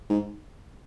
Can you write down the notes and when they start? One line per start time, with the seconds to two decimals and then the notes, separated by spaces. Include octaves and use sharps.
0.10 G#2